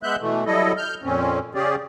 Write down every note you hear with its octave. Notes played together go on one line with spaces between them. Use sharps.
G#3 B3 E5 F#6 G6
B2 E3 A3
F#3 G3 E4 A4 D#5
F6 G6
F2 A#2 C4 C#4
C#3 C#4 G4 G#4 D5